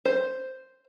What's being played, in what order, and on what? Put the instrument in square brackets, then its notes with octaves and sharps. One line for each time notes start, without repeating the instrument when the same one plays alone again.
[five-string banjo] C5